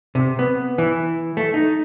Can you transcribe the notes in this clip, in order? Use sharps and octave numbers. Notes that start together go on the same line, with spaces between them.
C3
B3
E3
A3
D#4